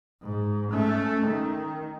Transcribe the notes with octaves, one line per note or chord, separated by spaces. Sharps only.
G#2
A3 C#4
D#3